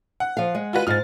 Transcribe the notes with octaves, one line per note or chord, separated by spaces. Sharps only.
F#5
F3 F5
G#3
F4 F#4 B4
G#2 F4 F6 A6